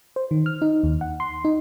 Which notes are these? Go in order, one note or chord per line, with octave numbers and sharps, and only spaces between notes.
C5
D#3
F6
D#4
D#2
F#5
C6
D#4